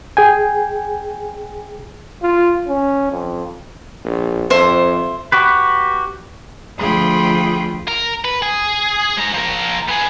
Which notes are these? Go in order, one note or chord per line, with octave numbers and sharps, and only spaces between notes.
G#4 G5 G#5
F4
C#4
F2
A#1
F2 C5 E5
F#4 G4 B4
D2 F3 F4 G#4 G5 B5
A#4
B4
G#4
G#3 A#5
F3 A#4
B3 G#4